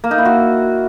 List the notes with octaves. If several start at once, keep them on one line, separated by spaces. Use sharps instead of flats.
A#3
D#4
E4
F#4